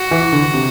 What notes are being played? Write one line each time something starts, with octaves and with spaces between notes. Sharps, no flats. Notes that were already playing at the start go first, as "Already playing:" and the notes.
Already playing: F#4
E3
D3
C3